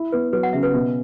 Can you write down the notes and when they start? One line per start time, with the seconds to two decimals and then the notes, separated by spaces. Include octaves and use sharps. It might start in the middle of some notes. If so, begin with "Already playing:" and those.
Already playing: E4
0.12 B3 B4
0.32 F#3 B4
0.43 F#5
0.53 C#3 E5
0.63 B4
0.73 B2